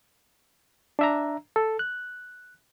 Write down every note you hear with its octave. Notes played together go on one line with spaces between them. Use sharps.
D4 E5 A#5
A4
F#6